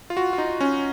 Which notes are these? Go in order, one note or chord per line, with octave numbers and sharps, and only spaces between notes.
F4
F#4
F4
D#4
C#4